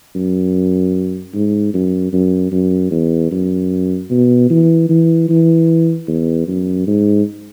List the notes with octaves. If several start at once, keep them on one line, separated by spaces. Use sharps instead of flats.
F#2
G#2
F#2
F#2
F#2
E2
F#2
B2
E3
E3
E3
E2
F#2
G#2